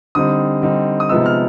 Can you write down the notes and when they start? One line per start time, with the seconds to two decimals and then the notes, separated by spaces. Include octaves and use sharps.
0.15 D3 G3 C4 D#4 D#6
0.62 D3 G3 C4 D#4
1.00 D#6
1.09 C3 F3 G#3 B3 D#4 E6
1.26 F6